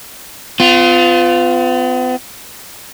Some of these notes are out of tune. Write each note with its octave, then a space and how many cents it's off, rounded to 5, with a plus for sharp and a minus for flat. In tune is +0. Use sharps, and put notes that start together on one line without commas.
B3 +45 F4 +0